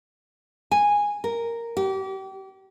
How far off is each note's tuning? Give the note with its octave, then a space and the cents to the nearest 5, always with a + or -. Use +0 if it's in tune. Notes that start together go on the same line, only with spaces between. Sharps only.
G#5 -10
A#4 -5
G4 -35